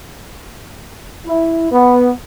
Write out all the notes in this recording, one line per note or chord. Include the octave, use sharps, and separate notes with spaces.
E4
B3